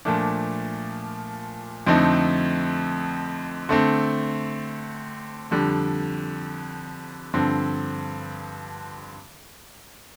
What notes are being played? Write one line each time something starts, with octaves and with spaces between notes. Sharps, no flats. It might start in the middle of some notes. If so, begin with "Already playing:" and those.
A#2 F3 A3 D4
F2 D3 A3 C4 D#4
D3 A3 C4
F2 D3 G3
G2 D3 F3 C4